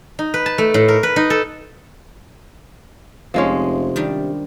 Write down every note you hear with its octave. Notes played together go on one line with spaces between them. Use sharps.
D#4
B4
A5
A3
A2
A#4
B4
D#4
A4
F1 C3 F3 G#3 C#4
D#3 G3 D4